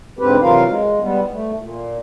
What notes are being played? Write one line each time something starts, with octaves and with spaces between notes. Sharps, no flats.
G#2 D3 C4 G4 B4
C3 E3 F#3 F4 A#4 F5
G#3
G3 B3
A3
A#2